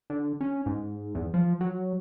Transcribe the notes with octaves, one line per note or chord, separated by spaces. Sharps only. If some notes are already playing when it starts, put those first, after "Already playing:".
D3
C#4
G#2
E2
F3
F#3